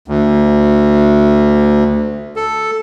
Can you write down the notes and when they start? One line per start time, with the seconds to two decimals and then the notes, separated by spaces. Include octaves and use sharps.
0.08 D2
2.36 A4